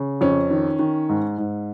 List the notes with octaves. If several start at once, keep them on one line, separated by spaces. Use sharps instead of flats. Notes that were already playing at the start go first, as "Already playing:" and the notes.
Already playing: C#3
F2 C#4
D#3
D#3
G#2
G#2